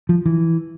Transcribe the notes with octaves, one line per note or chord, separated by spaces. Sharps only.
F3
E3